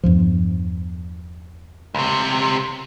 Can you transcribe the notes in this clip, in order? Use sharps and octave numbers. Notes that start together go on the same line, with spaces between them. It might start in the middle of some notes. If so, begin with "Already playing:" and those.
E2 G2 F3
C#2 C3